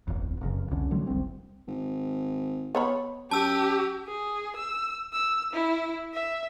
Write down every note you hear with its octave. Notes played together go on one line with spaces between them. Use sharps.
D1 G1 F2
F1 F#2 C#3
C2 F2 D3 C#4
D3 F#3 G3 A3
F#1 C2 G3 C4
G#1
B3 C#5 B5
F#2 G4 A5 E6
G#4
E6
E6
E4
E5